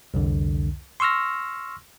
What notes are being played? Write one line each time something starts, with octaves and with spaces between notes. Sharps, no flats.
C2 F2 D3
C6 C#6 E6 F6 A#6